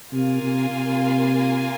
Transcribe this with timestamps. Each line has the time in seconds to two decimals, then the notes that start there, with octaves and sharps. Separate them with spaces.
0.13 C3 A#3 F4 A#4 F5 G#5
0.42 C3
0.71 C3